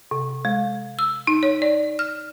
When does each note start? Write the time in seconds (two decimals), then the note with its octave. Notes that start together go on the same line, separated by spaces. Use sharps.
0.11 C3
0.45 G#3
0.99 E6
1.27 D#4
1.43 C#5
1.62 D5
1.99 F6